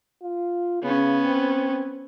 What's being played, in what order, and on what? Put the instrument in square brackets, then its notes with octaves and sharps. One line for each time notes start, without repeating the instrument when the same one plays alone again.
[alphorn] F4
[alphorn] C#3 [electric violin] B3 C#4
[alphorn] C4